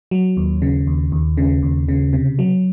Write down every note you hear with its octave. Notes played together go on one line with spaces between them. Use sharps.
F#3
D#2
C#3
D#2
D#2
C#3
D#2
C#3
C3
F#3